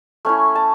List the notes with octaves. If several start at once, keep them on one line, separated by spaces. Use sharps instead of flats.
A3 C#4 E4
A5